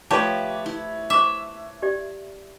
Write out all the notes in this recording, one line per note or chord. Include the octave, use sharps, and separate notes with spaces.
F3 A3 G4 B4 C#5 A5
E4
C5 E5 C#6 D6
G4 D5